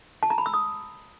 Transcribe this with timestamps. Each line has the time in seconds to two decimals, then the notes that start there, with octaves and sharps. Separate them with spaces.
0.23 A5
0.30 A#5
0.38 B5
0.46 E6
0.54 D#6